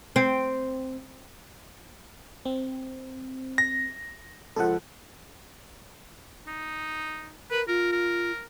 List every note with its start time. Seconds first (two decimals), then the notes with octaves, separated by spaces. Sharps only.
0.16 C4
2.45 C4
3.58 A#6
4.56 C#2 F3 A4 F#5
6.47 D#4
7.51 A#4 B4
7.68 F4 A#4
7.92 A#4